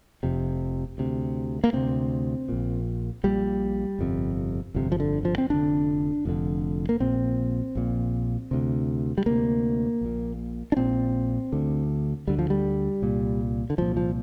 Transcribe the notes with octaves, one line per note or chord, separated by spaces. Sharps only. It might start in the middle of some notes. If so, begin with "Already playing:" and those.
F1 F2 C3
D2 C3
A#3
D2 C3 C4
A#1 A#2
A#1 A#2 G3
G1 F2 C3
G1 F2 C3
F3
D3
F3
C4
F1 F2 D3 D4
F1 F2 D3
A#3
A#1 A#2 C4
A#1 A#2
D2 C3
G3
D2 C3 A#3
A#1 A#2
D4
A#1 A#2 C4
D2 D3
D2 D3 G3
F3
G3
C2 A#2
D3
C2 A#2 F3
F3